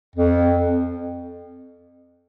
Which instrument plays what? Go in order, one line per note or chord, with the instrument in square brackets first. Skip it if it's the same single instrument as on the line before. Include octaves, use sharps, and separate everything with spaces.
[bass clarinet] F2